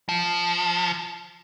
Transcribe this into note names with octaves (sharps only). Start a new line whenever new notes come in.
F3